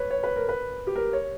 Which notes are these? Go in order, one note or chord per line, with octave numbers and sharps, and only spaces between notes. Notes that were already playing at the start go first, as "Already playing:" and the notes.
Already playing: B4 C#5
C#5
B4
A#4
B4
G4
A#4
C#5